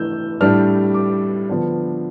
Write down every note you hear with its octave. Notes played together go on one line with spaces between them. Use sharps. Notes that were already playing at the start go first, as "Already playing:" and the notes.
Already playing: E3 A3 D4 E6 G6
A2 G3 D4 F6
D6
D3 F3 B3 D4